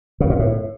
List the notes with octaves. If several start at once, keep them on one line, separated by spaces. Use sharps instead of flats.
C#3
A#2
A2